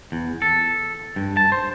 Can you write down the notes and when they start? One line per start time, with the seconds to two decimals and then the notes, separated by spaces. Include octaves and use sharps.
0.12 E2
0.42 A4
1.16 G2
1.37 A5
1.52 C5